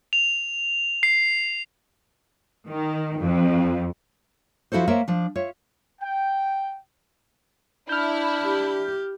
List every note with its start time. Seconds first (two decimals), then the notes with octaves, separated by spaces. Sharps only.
0.13 F7
1.03 C7
2.68 D#3
3.19 F2
4.72 F3 E4 F#4 A4 C5
4.88 A#3 A#4 C5 C#5 E5
5.08 F3 D4
5.35 F4 C#5 E5
6.01 G5
7.89 D4 E4 F6 G6
8.43 G4